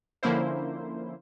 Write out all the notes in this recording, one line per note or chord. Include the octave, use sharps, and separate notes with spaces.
D3 F3 A#3 C#4 E4 C5